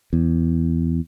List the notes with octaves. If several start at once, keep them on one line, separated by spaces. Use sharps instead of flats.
E2